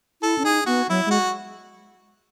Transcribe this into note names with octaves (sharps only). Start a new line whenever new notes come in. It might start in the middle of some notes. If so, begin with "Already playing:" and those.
E4 A4
C#4
D#4 G#4
B3 F#4
F#3 E4
G#3 F#4